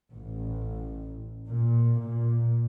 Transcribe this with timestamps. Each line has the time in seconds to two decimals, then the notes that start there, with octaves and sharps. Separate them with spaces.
0.12 A1
1.48 A#2
2.00 A#2